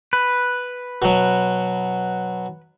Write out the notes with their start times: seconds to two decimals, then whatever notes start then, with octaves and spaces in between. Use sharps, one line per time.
0.13 B4
1.02 B2 F#3